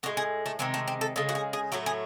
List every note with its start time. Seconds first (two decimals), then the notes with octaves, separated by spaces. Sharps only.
0.03 A2 G#3 F#4
0.17 G#4
0.46 A3
0.59 C3 D#3 G#3 C4
0.74 A3
0.88 C4
1.01 A4
1.16 C#3 G#3 A4
1.29 F#4
1.35 G#4
1.53 G#4
1.72 A2 F#3 A3 F#4
1.86 G#4